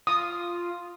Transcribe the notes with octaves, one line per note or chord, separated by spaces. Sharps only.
F4 D#6